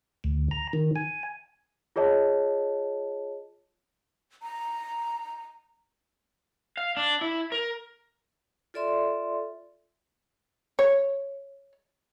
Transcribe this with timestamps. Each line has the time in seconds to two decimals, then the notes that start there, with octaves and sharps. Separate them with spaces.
0.24 D2
0.51 A#5
0.73 D#3
0.96 G#5
1.96 F4 G#4 C#5 D#5 A5
4.43 A#5
6.77 F5
6.97 D4
7.21 E4
7.52 A#4
8.74 F4 A4 D5 E5 C6
10.79 C#5